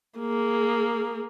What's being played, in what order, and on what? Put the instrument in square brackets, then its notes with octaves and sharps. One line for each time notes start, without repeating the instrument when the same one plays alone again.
[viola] A#3 G#4